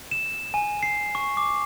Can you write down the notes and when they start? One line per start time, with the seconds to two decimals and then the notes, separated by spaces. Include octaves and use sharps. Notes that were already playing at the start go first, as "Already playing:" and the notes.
0.11 E7
0.54 G#5
0.83 C7
1.15 C#6
1.37 D6